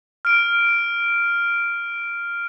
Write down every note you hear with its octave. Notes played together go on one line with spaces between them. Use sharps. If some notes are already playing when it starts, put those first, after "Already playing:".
F6 D7